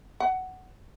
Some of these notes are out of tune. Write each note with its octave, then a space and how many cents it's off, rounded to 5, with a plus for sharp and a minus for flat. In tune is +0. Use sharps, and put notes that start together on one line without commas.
F#5 +10